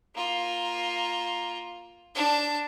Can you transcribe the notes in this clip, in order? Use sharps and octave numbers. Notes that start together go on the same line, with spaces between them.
A#3 F4
D4 A5